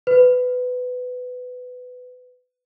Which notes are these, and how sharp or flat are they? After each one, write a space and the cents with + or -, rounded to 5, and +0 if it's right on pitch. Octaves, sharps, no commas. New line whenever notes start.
B4 +20